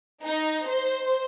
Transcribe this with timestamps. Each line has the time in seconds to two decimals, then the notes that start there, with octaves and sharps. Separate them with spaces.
0.24 D#4
0.66 C5